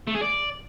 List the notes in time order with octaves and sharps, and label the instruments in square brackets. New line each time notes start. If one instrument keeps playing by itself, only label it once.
[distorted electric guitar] A3
G#4
D5